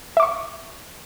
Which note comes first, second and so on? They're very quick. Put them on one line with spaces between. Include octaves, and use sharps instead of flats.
E5 D6 C#6